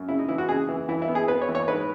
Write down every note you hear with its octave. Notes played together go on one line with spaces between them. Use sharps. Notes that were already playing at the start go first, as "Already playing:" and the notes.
Already playing: F#2
C#3 E4
D#4
E3 E4
F#4
C#3 G#4
E3
E3 E4
E4
B3
G#4
B3 B4
C#5
E3
C#5
G#2 B4